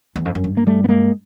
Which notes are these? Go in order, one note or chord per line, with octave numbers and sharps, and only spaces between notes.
E2
F2
F#2
G2
A#3
G3 A3
B3
G#3 A#3